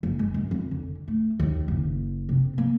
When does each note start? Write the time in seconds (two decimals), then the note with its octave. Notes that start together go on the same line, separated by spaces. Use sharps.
0.03 F#1
0.19 G#3
0.34 F#2
0.51 F2
0.71 D3
1.08 A3
1.40 D#2
1.68 F#1
2.29 C3
2.58 A#3